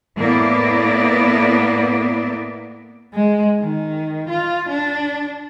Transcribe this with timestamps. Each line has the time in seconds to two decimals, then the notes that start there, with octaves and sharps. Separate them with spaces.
0.17 A2 A#3 B3 E4 D5
3.14 G#3
3.59 D#3
4.29 F4
4.69 D4